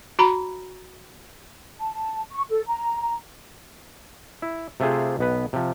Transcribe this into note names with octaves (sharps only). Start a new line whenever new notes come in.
F#4 A#5 B5
A5
C#6
A4
A#5
E4
C3 A3 F4 G#4 C5
B1 B3 B4
C3 F3